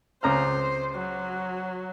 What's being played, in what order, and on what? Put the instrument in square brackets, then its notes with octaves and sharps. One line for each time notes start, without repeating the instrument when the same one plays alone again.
[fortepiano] C#2 A#5 F6 [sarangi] C5
[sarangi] F#3